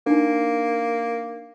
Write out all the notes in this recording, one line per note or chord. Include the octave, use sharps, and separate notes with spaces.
A#3 D4 D#4